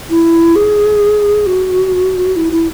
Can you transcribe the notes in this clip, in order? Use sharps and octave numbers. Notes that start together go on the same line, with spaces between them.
E4
G#4
F#4
E4
E4